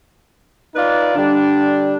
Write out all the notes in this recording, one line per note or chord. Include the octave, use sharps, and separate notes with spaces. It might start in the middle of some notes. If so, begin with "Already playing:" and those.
D#4 F4 B4 D5
D3 G3 D4